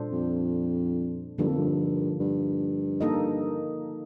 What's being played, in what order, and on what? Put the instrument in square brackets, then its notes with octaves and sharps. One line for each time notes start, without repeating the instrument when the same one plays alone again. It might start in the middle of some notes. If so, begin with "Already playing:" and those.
Already playing: [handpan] A#2 G3 D4 A4 C5
[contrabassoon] F2
[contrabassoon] G2 [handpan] D3 F3 A#3 D#4 A4
[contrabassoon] F2
G2
G2
[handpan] A#3 D#4 A4 D#5